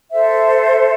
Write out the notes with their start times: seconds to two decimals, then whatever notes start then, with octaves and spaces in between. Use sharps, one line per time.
0.11 A4 C5 E5